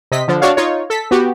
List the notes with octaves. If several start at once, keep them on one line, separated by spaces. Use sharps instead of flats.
C3 D#5 B6
D3 F3
D4 F#4 C#5 F5
D#4 F4 C#5
A4 B6
B3 F#4 G4